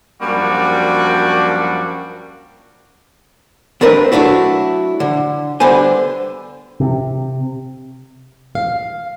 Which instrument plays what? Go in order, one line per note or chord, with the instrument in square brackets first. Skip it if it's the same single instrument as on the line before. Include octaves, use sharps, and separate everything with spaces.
[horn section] F#2 F3 G3 A#3 D4 F#4
[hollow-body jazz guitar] D#3 A3 C4 D4 A#4 B4
F#3 A3 D4 E4 F#4
D3
D3 G3 B3 C5 G#5
[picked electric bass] C3
[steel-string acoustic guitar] F5